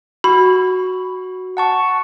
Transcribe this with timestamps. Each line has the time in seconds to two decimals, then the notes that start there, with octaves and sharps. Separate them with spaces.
0.24 F#4 B5
1.57 F#5 A5 C#6